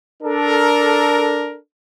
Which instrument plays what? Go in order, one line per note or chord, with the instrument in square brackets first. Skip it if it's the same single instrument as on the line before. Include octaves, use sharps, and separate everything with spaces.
[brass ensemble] D4 A4 A#4